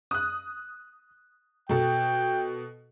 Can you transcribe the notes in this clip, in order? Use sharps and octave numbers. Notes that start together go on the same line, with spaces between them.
D#6 F#6
B2 A4 G5